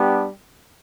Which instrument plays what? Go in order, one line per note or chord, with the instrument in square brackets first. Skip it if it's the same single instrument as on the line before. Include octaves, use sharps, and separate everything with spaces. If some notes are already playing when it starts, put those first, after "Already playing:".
Already playing: [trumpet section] G3 B3 D4 G4